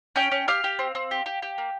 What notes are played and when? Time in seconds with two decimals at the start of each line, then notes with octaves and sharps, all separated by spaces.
0.16 C#4 G5 G6
0.32 C#4
0.48 G4 F5 F6
0.64 G4
0.79 C4
0.95 C4
1.11 G4
1.26 G4
1.42 G4
1.58 A#3